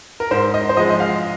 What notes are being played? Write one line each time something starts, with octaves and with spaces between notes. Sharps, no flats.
A#4
G#2 C5
D#5
C5
F3 G#3 D#5
D#5
F5